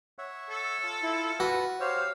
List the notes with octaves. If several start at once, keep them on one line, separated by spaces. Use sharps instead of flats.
C#5 E5 F#5
A4
F4 A5
E4
F#4 B4
G4 C5 C#5 F5 E6